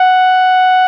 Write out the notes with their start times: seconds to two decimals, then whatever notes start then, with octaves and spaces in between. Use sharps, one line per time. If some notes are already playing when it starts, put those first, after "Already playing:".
Already playing: F#5